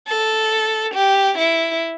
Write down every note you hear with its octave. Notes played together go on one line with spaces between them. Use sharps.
A4
G4
E4